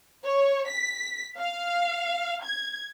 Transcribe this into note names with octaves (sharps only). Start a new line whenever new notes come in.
C#5
B6
F5
G#6